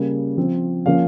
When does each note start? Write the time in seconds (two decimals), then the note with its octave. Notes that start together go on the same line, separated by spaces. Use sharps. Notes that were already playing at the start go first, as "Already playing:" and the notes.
Already playing: C#3 G3 A#3
0.37 F3 C4
0.86 F3 A#3 C#4 F5